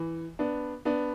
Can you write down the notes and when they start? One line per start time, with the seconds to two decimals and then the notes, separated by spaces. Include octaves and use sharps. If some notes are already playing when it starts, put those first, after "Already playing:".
Already playing: E3
0.39 B3 D4
0.85 B3 D4